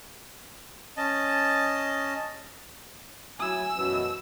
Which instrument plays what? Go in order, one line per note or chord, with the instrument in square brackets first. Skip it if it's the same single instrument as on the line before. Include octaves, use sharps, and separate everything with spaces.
[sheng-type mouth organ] C#4 D#5 A5
[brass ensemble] F#3 E4 G#5 [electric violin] E6
[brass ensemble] F#2 B2 E3